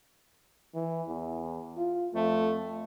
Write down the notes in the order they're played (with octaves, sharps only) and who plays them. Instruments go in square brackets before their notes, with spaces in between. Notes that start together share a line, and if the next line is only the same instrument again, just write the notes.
[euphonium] E3
E2
F4
[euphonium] F2 [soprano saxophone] A3